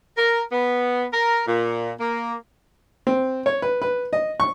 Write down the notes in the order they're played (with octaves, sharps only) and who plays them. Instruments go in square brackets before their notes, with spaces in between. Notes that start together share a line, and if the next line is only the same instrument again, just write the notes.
[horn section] A#4
B3
A#4
A#2
A#3
[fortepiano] C4
C#5
B4
B4
D#5
C#6